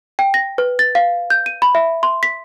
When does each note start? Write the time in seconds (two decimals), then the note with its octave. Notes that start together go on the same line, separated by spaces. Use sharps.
0.19 G5
0.34 A#6
0.58 B4
0.79 A6
0.95 F5
1.30 G6
1.46 D#7
1.62 B5
1.75 E5
2.03 C6
2.23 B6